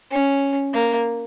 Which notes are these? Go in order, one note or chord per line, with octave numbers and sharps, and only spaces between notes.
C#4
A#3